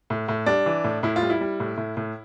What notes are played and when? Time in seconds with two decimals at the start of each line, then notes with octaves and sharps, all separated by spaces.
0.10 A2
0.28 A2
0.46 G3 D4
0.66 E3
0.84 A2
1.03 A2 E4
1.16 F4
1.22 G3
1.30 E4
1.41 G3
1.60 A2
1.77 A2
1.97 A2